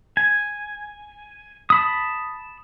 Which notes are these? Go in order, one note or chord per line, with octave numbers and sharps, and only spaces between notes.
G#5
A5 B5 D#6